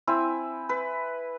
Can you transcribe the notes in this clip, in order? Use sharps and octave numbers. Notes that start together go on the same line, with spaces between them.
C4 E4 G#5
B4